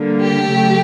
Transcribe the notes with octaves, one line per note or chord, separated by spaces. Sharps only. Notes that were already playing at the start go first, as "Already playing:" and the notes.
Already playing: D3 G3 A#3
G4
C#3 F#3 A3